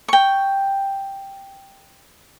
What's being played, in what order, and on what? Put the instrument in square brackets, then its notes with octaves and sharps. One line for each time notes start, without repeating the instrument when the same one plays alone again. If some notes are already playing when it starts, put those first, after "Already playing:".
[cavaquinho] G5 C#6